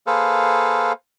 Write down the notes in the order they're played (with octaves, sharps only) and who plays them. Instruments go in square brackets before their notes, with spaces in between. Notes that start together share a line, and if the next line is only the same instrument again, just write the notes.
[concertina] A#3 G#4 A4 B4 C5 F5